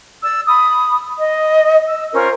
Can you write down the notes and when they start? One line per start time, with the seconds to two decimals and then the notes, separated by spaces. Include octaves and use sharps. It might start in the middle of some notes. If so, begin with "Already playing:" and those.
0.22 D5 E6
0.47 B5 D#6
1.17 D#5
1.87 E6
2.13 C#4 F4 A#4 C5